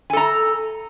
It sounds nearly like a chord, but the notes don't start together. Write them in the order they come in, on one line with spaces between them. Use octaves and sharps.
G#5 A4 A#5